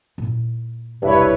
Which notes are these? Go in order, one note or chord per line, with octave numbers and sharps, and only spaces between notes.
A#2 E4
E1 C2 G2 E4 B4 C#5